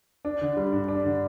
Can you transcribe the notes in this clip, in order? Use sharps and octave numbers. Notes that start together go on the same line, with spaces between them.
D4
D3
G3
G2
D4
D3